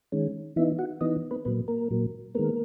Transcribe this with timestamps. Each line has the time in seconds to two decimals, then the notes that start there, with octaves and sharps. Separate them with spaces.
0.12 D#3 G#3 C#4
0.56 E3 B3 D#4 E4 E5
0.78 F#4 F#5
1.01 E3 B3 D#4 D#5
1.31 B3 B4
1.45 A#2 F#3 A#3 B3 B4
1.68 A#3 A#4
1.91 A#2 F#3 A#3
2.35 D#3 G#3 A#3 B3 A#4